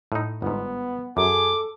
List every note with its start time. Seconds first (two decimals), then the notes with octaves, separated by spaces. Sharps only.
0.12 A2 D#4
0.42 G1 G#2 B3
1.17 F#2 G#4 A4 D6